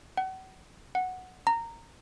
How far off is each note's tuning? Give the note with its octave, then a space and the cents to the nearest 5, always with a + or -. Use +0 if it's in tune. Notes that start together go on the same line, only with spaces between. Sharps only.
F#5 +40
F#5 +0
A#5 -15